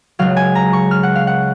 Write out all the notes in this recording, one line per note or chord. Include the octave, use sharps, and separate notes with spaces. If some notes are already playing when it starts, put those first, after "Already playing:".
C#2 C#3 F#3 F5
G#5
A#5
C#6
F6
F#5
F5
F#5